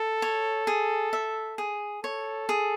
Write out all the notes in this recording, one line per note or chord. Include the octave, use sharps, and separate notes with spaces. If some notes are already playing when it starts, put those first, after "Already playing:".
Already playing: A4
C#5
G#4
E5
G#4
A4 C#5
G#4